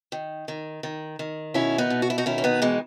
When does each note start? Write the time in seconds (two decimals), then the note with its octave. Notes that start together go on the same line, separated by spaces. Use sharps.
0.12 D#3
0.48 D#3
0.83 D#3
1.19 D#3
1.54 B2 C#4 E4
1.78 B3 D#4
1.90 B2
2.02 F#4
2.10 E4
2.18 D#4 F#4
2.26 D#3 C#4 E4
2.38 C#4
2.44 B3 D#4
2.62 D#3 E3 G#3